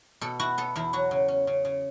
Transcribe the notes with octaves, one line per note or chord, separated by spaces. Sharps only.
B2 A4
E4 F#4
B3 A4
E2 E4
F#3 F#4
C#3
C#4
C#3
C#3